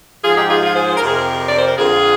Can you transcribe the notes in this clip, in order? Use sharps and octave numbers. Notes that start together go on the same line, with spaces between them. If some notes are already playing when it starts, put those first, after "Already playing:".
G#2 F3 F4 G#4
D#4 G4
F4 G#4
F4 G#4
G#4 C5
C5
A#4
F2 C3 F3 G#4
G4 A#4
D5
C5
A#4
F2 D3 F3 F4 G#4